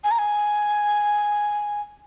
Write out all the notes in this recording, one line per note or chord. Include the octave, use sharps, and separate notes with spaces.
G#5
A#5
G#5